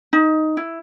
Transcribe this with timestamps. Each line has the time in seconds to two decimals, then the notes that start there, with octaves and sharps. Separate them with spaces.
0.13 D#4
0.57 E4